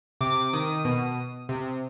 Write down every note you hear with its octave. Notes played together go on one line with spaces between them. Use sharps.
C3 D6
D#3 D#6
B2
C3